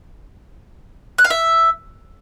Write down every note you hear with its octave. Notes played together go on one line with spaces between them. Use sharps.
F#6
F5
E5